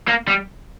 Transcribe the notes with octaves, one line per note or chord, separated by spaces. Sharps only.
A#3
G3